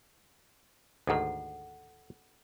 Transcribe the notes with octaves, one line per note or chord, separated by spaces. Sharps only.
D2 G#2 D#3 A4 F#5